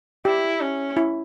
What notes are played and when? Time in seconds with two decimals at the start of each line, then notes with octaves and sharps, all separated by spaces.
0.25 E4 G4
0.61 C#4
0.97 E4